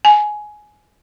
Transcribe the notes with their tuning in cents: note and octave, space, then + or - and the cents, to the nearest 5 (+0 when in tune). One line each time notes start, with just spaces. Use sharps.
G#5 +15